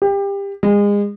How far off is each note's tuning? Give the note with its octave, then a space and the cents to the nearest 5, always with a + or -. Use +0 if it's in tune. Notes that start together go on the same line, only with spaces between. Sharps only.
G4 +25
G#3 -30